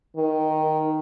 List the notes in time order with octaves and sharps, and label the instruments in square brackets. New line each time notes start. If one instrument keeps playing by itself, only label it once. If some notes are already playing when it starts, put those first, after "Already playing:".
[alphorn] D#3